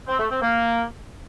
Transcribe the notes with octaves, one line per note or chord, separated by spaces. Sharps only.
C4
A3
C4
A#3